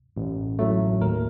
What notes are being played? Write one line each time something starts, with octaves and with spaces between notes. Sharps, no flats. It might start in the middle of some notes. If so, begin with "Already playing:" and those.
A1
A2 F#3 A3
D#2 A#4